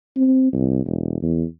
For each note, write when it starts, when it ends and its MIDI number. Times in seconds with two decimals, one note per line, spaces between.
0.16 0.50 60
0.53 0.85 36
0.85 1.17 28
1.22 1.44 40